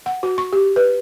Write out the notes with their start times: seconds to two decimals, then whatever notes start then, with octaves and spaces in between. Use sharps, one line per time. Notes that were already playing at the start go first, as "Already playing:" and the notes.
0.06 F#5
0.23 F#4
0.38 C#6
0.53 G4
0.76 B4